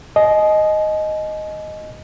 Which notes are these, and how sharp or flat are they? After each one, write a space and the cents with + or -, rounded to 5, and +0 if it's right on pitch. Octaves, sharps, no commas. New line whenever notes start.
D#5 +0 G#5 +40